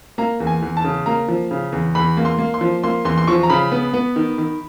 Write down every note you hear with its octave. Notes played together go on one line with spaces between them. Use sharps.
A#3 A#5
E2
G#5
E2
A5
C#3
A#3 A#5
F3
C#3
E2
E2 B5
A#3
C6
A#3
C6
F3
A#3 C6
E2 C6
C6
F3 C#6
A#5
C#3 B5
B3
B3
D#3
D#3